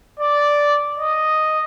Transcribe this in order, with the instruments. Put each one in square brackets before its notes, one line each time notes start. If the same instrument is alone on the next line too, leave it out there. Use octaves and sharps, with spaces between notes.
[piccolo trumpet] D5
D#5